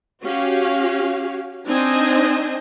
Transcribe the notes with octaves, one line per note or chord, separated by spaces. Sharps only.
C#4 F#4 G4 F5
C4 D4 D#4 C5 D#5 G#5